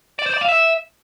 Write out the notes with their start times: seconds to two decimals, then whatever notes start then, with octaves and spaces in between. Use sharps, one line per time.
0.19 D5
0.26 C5
0.34 D5
0.41 F5
0.49 E5